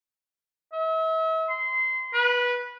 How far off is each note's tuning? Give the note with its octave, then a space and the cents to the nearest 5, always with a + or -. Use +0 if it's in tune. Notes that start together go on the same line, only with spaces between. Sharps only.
E5 -40
C6 -20
B4 -15